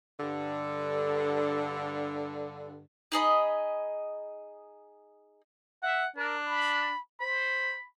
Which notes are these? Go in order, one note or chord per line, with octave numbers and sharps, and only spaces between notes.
G2 D3
D#4 G#4 D#5 B5
E5 F#5
D4 A#4
B5
C5 B5